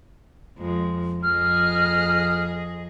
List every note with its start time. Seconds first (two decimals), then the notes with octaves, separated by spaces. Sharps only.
0.58 F2 G#3
1.23 F2 G#4 D#5 F6